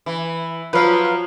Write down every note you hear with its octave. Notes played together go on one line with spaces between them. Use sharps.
E3
F3 F#3 F4 B4 F5